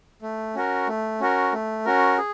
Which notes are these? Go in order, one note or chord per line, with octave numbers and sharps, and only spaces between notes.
A3
C#4 F#4 A#4
A3
C#4 F#4 A#4
A3
C#4 F#4 A#4
G#4